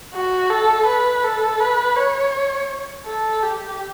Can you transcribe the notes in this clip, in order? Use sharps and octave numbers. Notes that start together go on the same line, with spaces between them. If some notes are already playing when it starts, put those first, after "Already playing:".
F#4
A4
B4
A4
B4
C#5
A4
G4